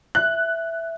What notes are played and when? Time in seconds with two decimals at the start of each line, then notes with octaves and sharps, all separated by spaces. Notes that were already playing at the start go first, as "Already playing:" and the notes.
0.15 E5 F#6